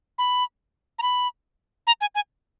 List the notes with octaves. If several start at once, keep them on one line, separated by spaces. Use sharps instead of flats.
B5
A#5
B5
A#5
G#5
G#5